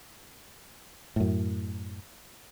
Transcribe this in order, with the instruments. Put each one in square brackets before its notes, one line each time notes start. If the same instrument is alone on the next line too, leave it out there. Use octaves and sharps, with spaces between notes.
[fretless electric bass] F#2 A2